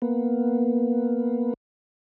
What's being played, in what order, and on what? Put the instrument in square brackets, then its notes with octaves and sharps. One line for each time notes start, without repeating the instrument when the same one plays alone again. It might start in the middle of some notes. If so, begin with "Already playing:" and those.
[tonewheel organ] A#3 B3